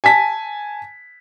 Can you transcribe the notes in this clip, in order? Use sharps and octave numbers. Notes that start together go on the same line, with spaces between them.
G#5 A5 B6